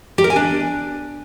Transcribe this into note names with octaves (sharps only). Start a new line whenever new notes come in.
G4
A#4
G#5
D4